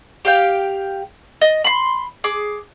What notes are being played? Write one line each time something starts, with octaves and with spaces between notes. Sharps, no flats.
G4 F5 G5
D#5
B5 C6
G#4 D6